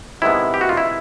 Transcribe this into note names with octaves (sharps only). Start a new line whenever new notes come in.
C3 D#3 G#3 B3 E4
G4
F#4
F4
E4